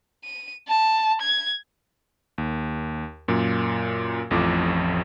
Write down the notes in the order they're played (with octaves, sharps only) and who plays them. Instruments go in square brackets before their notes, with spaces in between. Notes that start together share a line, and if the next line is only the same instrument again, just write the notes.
[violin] D#7
A5
G#6
[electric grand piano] D#2
F#2 A#2
A1 F2 A2 F3 D6